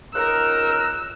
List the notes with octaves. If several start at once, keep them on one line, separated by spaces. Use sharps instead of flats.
C#2 D#4 A#4 E6 F#6